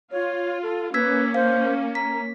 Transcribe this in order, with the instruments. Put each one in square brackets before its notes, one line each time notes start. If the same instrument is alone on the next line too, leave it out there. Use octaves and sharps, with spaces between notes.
[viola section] F4 [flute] C#5
[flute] A4
[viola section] A#3 C#4 [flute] B4 [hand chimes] E6 G#6 B6
[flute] C5 [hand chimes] F5
[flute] A#5 [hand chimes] B6